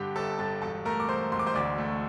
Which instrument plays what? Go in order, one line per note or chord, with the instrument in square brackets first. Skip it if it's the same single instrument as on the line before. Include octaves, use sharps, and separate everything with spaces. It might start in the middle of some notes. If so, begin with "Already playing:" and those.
Already playing: [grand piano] G2 D3 G4 G5
G1 A4 A5
G2 A4 A5
E1 A4 A5
A3 A#4 A#5
D6
E1 C5 C6
E1 C6
D6
C5 C6
D2 D5 D6
A3